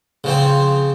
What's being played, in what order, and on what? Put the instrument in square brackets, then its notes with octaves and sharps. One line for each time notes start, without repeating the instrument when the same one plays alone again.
[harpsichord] C#3 F3 C4